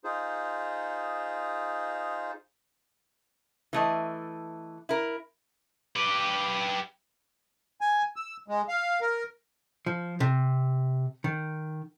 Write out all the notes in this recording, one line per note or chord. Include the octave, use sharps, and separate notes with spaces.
D#4 F4 G#4 C5
E3 A3 D#5
E4 A#4
G4 B4
G#5
E6
G#3
F5
A#4
F3
C3
D#3